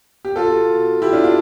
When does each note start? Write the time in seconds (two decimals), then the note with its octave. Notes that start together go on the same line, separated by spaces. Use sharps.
0.25 G4
0.36 B2 F4 A4
0.69 B2
1.02 B2 E4 G4
1.13 D4 F4
1.24 D4 F4